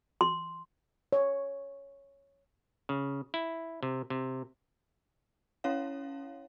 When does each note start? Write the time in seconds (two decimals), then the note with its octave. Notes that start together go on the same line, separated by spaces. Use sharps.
0.21 C6
1.13 C#5
2.89 C#3
3.34 E4
3.83 C3
4.10 C3
5.64 C#4 E4 C#5 F5